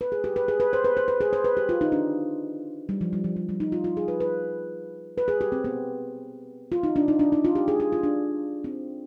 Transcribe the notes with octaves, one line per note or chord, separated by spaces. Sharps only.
B4
G#4
G4
B4
G#4
B4
C5
B4
C5
B4
G#4
C5
B4
G4
F4
D#4
D4
G3
F3
G3
F3
G3
G3
D#4
F4
F4
G#4
B4
B4
B4
G#4
G4
C4
B3
F4
D#4
D4
D#4
D4
D#4
F4
G4
G#4
G#4
F4
D4
C4